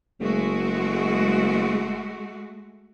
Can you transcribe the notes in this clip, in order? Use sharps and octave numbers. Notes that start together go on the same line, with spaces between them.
F#1 G#3 A3 F#4